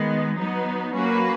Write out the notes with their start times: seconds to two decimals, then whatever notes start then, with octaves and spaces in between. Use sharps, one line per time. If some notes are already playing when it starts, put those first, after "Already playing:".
Already playing: D#3 G#3 B3
0.37 F#3 B3 D#4
0.94 F#3 A#3 C#4 F#4 B4